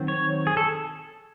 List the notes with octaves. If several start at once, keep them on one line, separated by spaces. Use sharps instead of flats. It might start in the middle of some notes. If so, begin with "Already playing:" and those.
Already playing: D#3 F#3 C4
C#5
G#4
A4